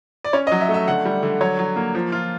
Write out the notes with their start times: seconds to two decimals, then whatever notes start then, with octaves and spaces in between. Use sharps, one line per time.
0.24 D5
0.33 C#4 C#5
0.47 D#5
0.52 F#3
0.61 E5
0.69 A3
0.74 E5
0.88 D3 F#5
1.05 G3
1.23 D3
1.41 F#3 C#5
1.59 F#3
1.76 A#3
1.95 F3
2.12 F4